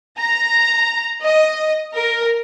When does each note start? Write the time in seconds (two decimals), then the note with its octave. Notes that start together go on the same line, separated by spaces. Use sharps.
0.18 A#5
1.22 D#5
1.93 A#4